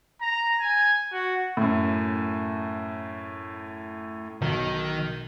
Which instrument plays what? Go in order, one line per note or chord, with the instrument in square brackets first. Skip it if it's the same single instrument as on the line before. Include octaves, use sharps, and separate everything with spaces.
[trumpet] A#5
G#5
F#4
[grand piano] F#2 A2
[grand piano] B1 [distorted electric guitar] D#3